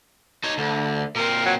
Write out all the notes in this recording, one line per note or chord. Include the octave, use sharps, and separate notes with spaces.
D#4 C#5
D2 D3
A#2 C4 A#4
F#3